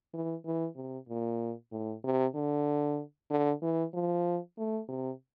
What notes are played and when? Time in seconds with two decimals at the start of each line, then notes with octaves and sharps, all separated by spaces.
0.14 E3
0.45 E3
0.76 C3
1.09 A#2
1.72 A2
2.04 C3
2.35 D3
3.30 D3
3.62 E3
3.94 F3
4.58 A3
4.89 C3